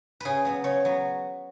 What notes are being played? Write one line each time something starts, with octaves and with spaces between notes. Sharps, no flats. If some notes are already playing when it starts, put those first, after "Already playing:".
C#3 G#4 B4
F#3 B3
C#3 C#5
F#3 B3